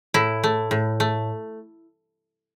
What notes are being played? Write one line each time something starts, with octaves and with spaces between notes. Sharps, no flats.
A2 E4
A3
A2
A3